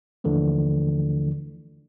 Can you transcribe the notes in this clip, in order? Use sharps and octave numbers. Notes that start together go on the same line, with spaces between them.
D#2 D3 E3 F3 A3